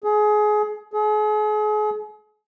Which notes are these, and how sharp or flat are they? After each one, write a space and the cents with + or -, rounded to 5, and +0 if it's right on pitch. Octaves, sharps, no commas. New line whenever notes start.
G#4 +25
G#4 +40